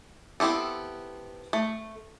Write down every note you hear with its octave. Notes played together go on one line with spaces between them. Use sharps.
B3 C4 E4 G4 A4
A3